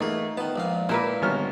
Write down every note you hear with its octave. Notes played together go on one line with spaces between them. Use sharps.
E2 A3 A#3 D#4 G#4
D#3 B3 A5
A#1 A#2 G#3 F5
A#2 A#3 E4 A#4 B4
G#1 D3 G3 B3 C#5 F6